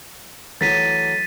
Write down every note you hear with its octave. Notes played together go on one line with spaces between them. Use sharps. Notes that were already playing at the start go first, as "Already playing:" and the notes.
E3 F#3 A3 A6 B6 D#7